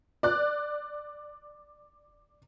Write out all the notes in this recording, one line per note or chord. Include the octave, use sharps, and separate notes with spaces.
D5 F#6